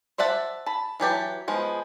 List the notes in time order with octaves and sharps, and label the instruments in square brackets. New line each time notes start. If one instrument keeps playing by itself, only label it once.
[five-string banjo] C5 D5 E5 F#5 A5
A5 B5
E3 F#3 G4 A5
F3 G#3 B3